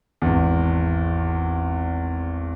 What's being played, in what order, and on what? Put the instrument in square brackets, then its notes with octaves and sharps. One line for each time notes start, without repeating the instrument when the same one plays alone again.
[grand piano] G#1 E2